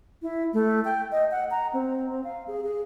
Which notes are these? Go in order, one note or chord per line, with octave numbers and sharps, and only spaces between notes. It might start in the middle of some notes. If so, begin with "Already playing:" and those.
E4
A3
G5
D#5
F#5
A#5
C4
F5
G#4
G#4